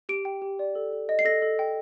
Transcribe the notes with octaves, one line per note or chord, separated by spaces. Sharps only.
G4 D7
G5
G4
D5
A4
A4
D#5
C7
A4 A#6
A4
G5